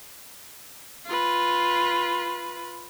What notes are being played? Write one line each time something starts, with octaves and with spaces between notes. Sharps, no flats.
F4 B4